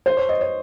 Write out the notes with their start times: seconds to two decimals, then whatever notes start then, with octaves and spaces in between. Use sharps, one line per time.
0.06 C5
0.17 C#5
0.29 D#5
0.41 C#5